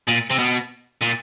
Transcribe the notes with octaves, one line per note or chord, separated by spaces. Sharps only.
A#2
C3
B2
A#2